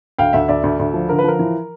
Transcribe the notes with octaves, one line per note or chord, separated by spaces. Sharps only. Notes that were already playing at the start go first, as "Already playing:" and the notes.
D2 F5 G5
D2 E5 F#5
D2 D5 E5
D2
D2
F3
D3 A#4
B4
F3 A#4
E3